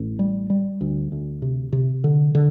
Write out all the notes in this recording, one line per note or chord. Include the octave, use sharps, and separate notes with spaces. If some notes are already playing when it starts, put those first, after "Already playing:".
Already playing: A1
G3
G3
D2
D2
C3
C3
D3
D3